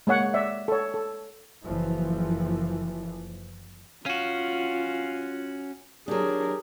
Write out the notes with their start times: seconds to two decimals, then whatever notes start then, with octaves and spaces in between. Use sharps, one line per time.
0.07 G#3 A#3 C#5 F#5
0.34 D5 E5
0.68 A4 C#5
0.94 A4
1.64 F#1 E3 F3
4.06 C#4 F4 F#4 F5
6.08 F#3 D4 G4 G#4 A#4